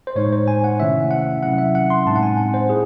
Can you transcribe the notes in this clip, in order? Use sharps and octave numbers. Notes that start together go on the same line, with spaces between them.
C5
A2 G#3 D#4 C#5
C5
G#5
F#5
C3 D#3 A3 C#4 E4 E5
F#5
C3 F#3 C#4 E4 F#5
E5
F#5
C6
A2 G#3 C4 D#4 A5
F#5
G#5
F#5
C5
E4 G#4